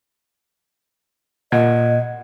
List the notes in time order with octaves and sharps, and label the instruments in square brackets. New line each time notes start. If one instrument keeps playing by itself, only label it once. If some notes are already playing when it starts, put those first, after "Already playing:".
[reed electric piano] A#2 F#5 G#6 [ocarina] D#5